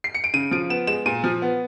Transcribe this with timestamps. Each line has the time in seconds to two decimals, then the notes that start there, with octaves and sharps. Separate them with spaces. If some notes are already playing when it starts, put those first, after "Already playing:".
0.04 C7
0.15 C#7
0.24 D7
0.34 C#3 D#7
0.51 F3 D7
0.70 B3 E7
0.87 G#3 E7
1.06 A#2 D#7
1.24 F3
1.42 B3